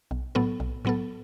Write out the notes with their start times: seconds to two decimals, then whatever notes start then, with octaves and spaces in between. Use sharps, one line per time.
0.11 B1
0.35 A2 F#3 B3 A4
0.60 B1
0.85 A2 F#3 B3 A4